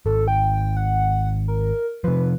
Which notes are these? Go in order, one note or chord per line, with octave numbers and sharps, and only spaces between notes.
G#1 A4
G5
F#5
A#4
C3 F3 B4